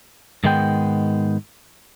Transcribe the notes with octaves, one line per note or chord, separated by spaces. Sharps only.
G#2 D#3 G#3 B3 G5